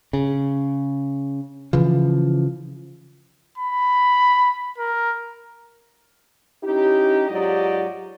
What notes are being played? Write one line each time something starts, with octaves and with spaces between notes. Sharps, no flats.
C#3
C#3 E3 F3
B5
A#4
C#4 D#4 E4 G4
G#2 F#3 F4 G4 D5 D#5